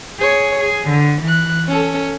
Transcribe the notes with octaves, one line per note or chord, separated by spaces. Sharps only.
G#4 C#5
G#4
D3
E3 F#6
C#4 A4